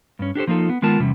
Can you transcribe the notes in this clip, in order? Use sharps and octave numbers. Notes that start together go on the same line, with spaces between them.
G2 C#4
D4 G4 A4 C5
F3 A#3 D#4 F4 A4
B3
D#3 G#3 B3 F4 A#4 A5
E2 C3 G3 C#4